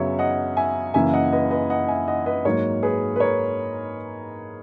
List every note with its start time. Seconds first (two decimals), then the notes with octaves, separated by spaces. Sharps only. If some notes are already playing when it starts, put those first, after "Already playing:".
Already playing: F#2 C#3 F#3 B3 C#5 E5
0.19 D#5 F#5
0.57 E5 G#5
0.94 F#2 C#3 E3 A#3 E5 G#5
1.13 D#5 F#5
1.32 B4 D#5
1.51 B4 D#5
1.70 D#5 F#5
1.88 E5 G#5
2.08 D#5 F#5
2.26 B4 D#5
2.45 G#2 F#3 A#3 A#4 C#5
2.83 G#4 B4
3.16 B4
3.20 A#4 C#5